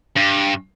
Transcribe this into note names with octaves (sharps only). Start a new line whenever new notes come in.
G2